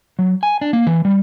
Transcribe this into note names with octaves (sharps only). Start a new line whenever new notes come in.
F#3
G#5
D4
A#3
E3
G3